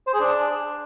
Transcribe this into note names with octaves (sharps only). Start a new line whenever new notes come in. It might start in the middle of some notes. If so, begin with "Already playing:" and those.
C5
G#4
D4